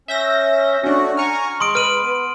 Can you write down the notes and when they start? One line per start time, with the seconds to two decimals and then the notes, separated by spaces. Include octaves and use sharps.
0.08 C#4 E5 G6 A#6
0.84 A3 C#4 D4 F#4
1.17 G#5 A#5 C#6 F6
1.60 G#3 C6 D#6 D7
1.75 B4 F6 D#7 F#7
2.02 B3